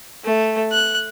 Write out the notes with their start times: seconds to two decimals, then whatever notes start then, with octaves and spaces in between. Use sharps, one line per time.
0.24 A3
0.72 F#6